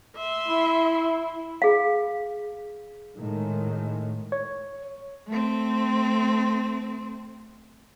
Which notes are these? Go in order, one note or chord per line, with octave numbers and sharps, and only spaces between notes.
E5 C6
E4
G#4 F5
A2 D#3 G#3
C#5
A3 C4